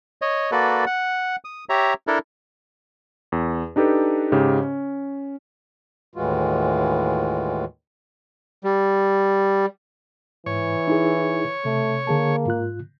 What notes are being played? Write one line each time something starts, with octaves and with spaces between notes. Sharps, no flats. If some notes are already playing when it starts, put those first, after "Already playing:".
C#5 D#5
A#3 F#4 A4 B4 D5
F#5
D#6
G4 C#5 E5 A#5
D4 E4 A4 A#4
E2
D4 D#4 G4 A4 B4
G#2 C#3 G4
C#4
D#2 A2 E3 G#3 F4 F#4
G3
G#2 E3 C#5
D#4 E4 G#4
C3 A3
D3 A#3 G#4 A5
G#2 F4 F#6